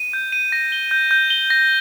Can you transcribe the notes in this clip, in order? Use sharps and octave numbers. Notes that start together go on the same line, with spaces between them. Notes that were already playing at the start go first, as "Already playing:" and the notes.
Already playing: D#7
G6
D#7
A#6
G7
G6
G6
G7
A#6